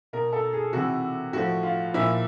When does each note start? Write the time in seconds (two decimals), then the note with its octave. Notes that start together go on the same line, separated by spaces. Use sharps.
0.13 B2 A#4
0.33 A4
0.53 G#4
0.73 C3 E3 F#4
1.33 A2 F3 F#4
1.63 F4
1.94 A#2 F3 E4